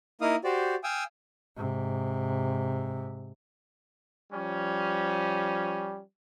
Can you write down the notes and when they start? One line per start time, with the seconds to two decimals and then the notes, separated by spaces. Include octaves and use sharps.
0.21 A#3 D#4 E4 F5 D#6
0.44 F#4 G4 C5 D5
0.84 F5 G5 G#5 D#6 E6
1.57 G#2 C3
4.33 F3 G3 C#4